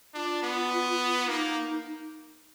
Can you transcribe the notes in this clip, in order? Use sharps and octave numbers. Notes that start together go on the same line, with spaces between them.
D4 F4
B3
A#3 D#4